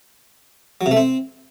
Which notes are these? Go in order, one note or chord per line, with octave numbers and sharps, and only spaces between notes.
F#3
C3
A3
C4